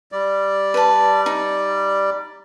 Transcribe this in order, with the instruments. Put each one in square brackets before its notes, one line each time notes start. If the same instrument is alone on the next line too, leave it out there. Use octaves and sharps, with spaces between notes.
[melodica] G3 D5
[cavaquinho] B4 A5
D#4